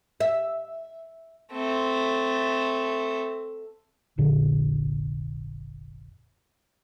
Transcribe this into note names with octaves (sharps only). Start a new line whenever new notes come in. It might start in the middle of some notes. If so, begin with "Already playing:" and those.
E5
A3 C4
F1 A#1 A#2 D3